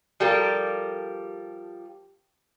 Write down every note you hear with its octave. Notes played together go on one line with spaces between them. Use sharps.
F3 G3 G4 A4 A#4